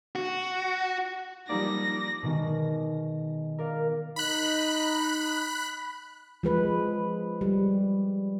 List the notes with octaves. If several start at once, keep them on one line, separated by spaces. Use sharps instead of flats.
F#4
F3 G3 A#3 D#4 D5 A#6
B2 D#3 G#3
A#4 D5 F5
D#4 B5 F#6
F3 G#3 B4
G3